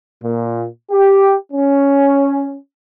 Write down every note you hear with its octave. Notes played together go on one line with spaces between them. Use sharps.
A#2
G4
C#4